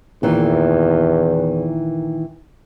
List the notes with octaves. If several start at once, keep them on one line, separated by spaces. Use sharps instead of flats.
E2 A#2 D#3 E3